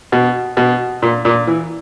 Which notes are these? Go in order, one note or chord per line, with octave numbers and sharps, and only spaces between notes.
B2
B2
A#2
A#2
E3